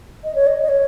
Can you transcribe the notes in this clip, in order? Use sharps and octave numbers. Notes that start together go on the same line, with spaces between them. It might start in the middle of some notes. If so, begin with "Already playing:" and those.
D#5
C#5
D#5
D#5
C#5